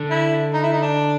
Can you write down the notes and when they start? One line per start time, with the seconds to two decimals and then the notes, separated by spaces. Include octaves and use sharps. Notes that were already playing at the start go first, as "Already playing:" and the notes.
Already playing: D3
0.10 E4
0.54 D#4
0.63 E4
0.73 D#4
0.82 D4